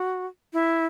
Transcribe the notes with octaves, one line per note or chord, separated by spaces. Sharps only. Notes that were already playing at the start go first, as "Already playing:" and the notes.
Already playing: F#4
E4